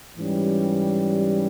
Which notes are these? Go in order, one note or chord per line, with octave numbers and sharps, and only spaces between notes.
G#2 E3 G3 C#4